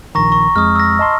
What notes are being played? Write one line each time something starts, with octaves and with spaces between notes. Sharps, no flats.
A#1 D#3 A#5 C#6 A#6
C#6
F2 G#3 D#6 F6
E6 A#6
D#5 A5 C6